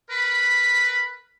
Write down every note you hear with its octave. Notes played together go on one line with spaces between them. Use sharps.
A#4 B4 B5